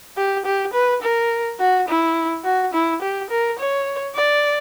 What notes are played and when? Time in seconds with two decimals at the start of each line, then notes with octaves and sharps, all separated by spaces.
0.17 G4
0.45 G4
0.73 B4
1.02 A#4
1.60 F#4
1.88 E4
2.44 F#4
2.74 E4
3.02 G4
3.30 A#4
3.59 C#5
4.15 D5